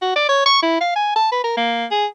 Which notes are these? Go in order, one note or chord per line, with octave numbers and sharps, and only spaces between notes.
F#4
D5
C#5
C#6
E4
F5
G#5
A5
B4
A#4
A#3
G#4